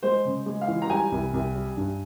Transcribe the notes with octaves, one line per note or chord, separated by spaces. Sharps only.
G#3 C5
C#3
G#3
F5
E3
A#5
G3 G#5
C2
C2
G3
G2